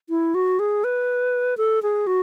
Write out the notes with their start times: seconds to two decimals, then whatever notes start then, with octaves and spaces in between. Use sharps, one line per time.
0.09 E4
0.35 F#4
0.59 G#4
0.84 B4
1.57 A4
1.83 G#4
2.07 F#4